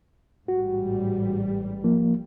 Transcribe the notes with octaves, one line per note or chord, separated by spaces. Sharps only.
A1 G#2 G3 F#4
F3 A#3